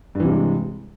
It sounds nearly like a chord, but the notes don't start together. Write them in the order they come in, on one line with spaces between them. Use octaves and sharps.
G2 E3 C3 G#3